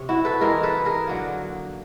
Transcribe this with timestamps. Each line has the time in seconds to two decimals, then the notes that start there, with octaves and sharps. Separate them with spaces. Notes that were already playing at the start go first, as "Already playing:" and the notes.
Already playing: C3 C#5
0.09 E4 F#4
0.25 A4 B4
0.41 C3 E3 G#3 G#4 A#4
0.63 A4 B4
0.85 G#4 A#4
1.07 D3 F#3 A#3